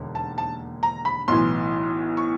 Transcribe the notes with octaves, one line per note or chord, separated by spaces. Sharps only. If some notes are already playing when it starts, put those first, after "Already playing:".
Already playing: E1 D#2 D3
A5
A5
A#5
B5
B1 A2 E3 C6
C#6